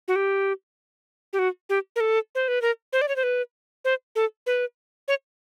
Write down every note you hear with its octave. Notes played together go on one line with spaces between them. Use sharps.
F#4
G4
G4
F#4
G4
A#4
A4
C5
B4
A#4
C5
D5
C#5
C5
B4
C5
A4
B4
C#5